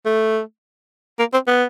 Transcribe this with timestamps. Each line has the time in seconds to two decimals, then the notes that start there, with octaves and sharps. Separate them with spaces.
0.06 A3
1.19 A#3
1.33 C4
1.47 B3